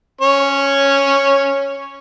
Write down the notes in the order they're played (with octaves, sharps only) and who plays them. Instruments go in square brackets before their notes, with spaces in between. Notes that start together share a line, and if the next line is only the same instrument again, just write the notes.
[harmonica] C#4 C#5